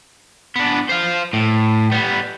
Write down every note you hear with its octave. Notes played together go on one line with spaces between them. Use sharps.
B3 D4
C5 F5
A2
G3 B3